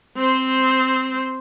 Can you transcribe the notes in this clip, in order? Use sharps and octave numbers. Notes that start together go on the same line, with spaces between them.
C4 C5